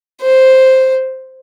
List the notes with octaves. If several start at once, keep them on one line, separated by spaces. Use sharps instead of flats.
C5